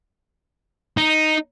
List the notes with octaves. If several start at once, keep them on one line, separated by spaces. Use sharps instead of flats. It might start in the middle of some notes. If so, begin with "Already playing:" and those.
D#4